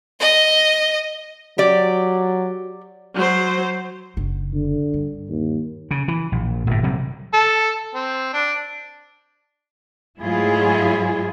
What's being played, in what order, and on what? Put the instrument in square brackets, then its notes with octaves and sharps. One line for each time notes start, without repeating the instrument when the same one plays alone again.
[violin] D#5
[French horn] F#3 [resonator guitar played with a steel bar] G4 D5
[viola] F#3 C5
[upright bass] F#1 D4
[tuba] D3
[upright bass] G2
[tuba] D#2
[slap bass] C#3
E3
A#1
G1 A2
C3 F#3 G3
[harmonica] A4
C4
D4
[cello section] G#2 F#3 A3 E4 F4 G#4